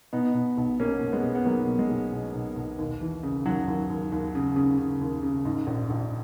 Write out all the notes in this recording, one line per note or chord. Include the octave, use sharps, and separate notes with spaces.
B2 B3 D#4
B2
B1
B2 A#3 C#4
B1
G#3 B3
B2
B3
B1 F#3 A#3
B2
G#3
B1
B2
B1
B1
D#2
E3
C#3
D#2 F#3
D#2
D#2
D#2
C#3
C#3
C#3
D#2
C#3
G#2
A#1
A#1